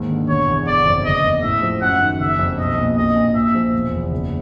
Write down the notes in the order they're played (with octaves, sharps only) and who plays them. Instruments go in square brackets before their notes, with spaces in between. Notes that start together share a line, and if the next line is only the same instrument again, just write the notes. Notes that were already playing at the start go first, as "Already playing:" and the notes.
Already playing: [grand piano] D#2 G#2
D3
[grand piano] E1 [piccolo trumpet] C#5
[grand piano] E2
[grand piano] G1 [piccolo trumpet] D5
[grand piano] F2
[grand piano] F#1 [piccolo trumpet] D#5
[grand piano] E2
[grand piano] A2 [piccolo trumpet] E5
[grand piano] F3
[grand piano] F#2 [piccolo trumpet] F#5
[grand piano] D#3
[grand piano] F#1 [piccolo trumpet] E5
[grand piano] F2
[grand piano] B1 [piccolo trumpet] D#5
[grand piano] A#2
[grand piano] A#1 [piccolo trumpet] D#5
[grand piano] A#2
[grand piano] A#2 [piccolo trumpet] E5
[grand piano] F3
E1
E2
F#1